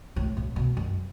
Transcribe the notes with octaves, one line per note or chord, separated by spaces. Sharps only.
A2
A2
B2
F#2